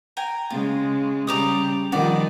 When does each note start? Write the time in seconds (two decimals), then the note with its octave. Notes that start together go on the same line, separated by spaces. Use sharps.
0.17 G5 G#5 A#5
0.50 C#3 G#3 F4
1.27 C#3 G3 G4 A#5 D6 D#6
1.92 D#3 F3 G3 D5 F#5